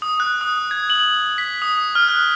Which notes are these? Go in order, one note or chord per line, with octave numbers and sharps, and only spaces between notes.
D#6
F#6
D#6
G#6
F#7
B6
D#6
F6
F#6